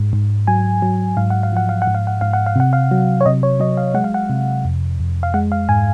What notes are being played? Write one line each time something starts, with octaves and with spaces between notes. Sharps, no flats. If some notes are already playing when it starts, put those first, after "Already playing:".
Already playing: G#2 G#3
G#2
F#3 G#5
F#3
G#2 F5
F#5
F5
F3 F#5
F5
F#5
G#2
F5
F#5
G#2 F5
F#5
F5
C3 F#5
F5
F#3
C#5
C3 D#5
C#5
F#3 D#5
F5
G#3 F#5
F5
F#5
C3
F2
F2
F5
G#3 F#5
F5
G#2 G#5